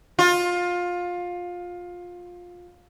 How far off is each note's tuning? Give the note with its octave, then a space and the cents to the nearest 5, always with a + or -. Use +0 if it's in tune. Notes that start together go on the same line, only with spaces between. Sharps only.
F4 +20